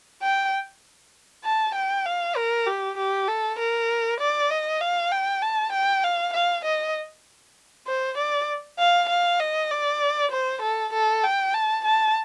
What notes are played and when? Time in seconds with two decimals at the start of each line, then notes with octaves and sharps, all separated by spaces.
0.22 G5
1.44 A5
1.75 G5
2.05 F5
2.36 A#4
2.67 G4
2.98 G4
3.28 A4
3.59 A#4
4.20 D5
4.51 D#5
4.81 F5
5.11 G5
5.42 A5
5.73 G5
6.04 F5
6.34 F5
6.65 D#5
7.87 C5
8.18 D5
8.79 F5
9.09 F5
9.40 D#5
9.71 D5
10.32 C5
10.62 A4
10.93 A4
11.24 G5
11.54 A5
11.85 A5